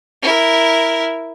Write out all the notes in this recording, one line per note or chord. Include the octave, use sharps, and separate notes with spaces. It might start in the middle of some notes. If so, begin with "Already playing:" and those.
E4 A#4